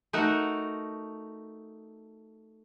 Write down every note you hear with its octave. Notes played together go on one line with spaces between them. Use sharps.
A3 D#4 F#4 A#4